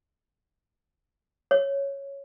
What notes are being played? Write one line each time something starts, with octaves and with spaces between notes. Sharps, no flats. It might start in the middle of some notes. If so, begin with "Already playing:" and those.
C#5